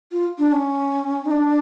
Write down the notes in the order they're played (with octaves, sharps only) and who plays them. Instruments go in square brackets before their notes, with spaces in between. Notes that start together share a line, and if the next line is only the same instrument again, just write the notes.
[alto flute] F4
D4
C#4
D#4
D4